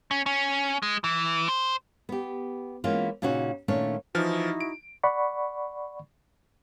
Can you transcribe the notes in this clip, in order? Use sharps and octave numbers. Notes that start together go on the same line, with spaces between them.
C#4
C#4
G#3
E3
C5
B3 G4
E3 G#3 A#3 B3 C#4 F4
A#2 C#3 C#4 D#4 F#4
A#2 D#3 A3 C#4 D4 C#5
E3 F3 D#4 E4 F#4 F6
D7
D5 F#5 B5 C#6